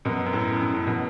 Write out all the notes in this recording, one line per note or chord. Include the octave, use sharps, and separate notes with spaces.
F#2 B2
F#2
A2
F#2
A2
B2